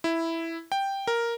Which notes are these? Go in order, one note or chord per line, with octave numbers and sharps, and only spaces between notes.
E4
G5
A#4